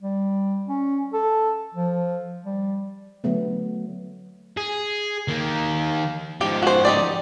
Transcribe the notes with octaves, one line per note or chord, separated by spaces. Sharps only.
G3
C#4
A4
F3
G3
D3 F#3 A3 B3
G#4
D#3 A#3
G#2 F3 G4
F#4 C5
D#4 G4 D5